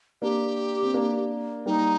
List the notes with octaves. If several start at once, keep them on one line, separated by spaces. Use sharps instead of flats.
A#3 D4 G4
C4
A#3 D4
G3 A#3 D#4